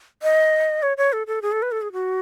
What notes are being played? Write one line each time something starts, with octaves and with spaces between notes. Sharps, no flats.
D#5
C#5
C#5
A4
A4
G#4
A4
B4
A4
G#4
F#4